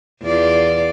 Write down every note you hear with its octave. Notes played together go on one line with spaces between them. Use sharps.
E2 F4 D5